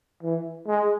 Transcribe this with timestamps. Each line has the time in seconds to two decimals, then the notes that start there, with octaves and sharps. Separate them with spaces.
0.23 E3
0.67 G#3